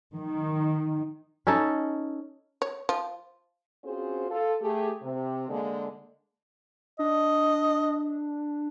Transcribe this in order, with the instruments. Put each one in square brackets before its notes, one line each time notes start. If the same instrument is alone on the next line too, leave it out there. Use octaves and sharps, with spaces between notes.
[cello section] D#3
[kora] C#4 D#4 A4
[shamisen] C#5
F3
[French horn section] C4 C#4 F4 F#4 G#4 C5
F4 A4
A3 G4 G#4
C3
D3 G#3 A#3
[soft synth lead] D4 [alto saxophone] D#5